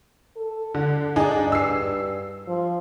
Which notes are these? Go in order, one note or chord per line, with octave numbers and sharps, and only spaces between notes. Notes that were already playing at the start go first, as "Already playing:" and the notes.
A4
D3
G2 D4 D#4 G#4
E6 C7
F3